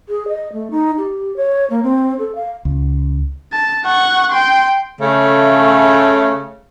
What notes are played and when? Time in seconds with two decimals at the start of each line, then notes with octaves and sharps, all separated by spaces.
0.09 G#4
0.28 D#5
0.53 A3
0.71 D#4
0.98 G4
1.37 C#5
1.70 A#3
1.83 C4
2.19 A4
2.35 F5
2.65 C#2
3.52 A5
3.85 F#5 C#6
4.32 G5 C6
5.00 C#3 A3